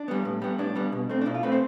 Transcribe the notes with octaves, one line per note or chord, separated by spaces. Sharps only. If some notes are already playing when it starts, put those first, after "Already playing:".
Already playing: D4
G3 B3
A2
G3 B3
A2 D4
G3 B3
B2
A3 C4
D4
B2 E4
F4
A3 C4 B4
C5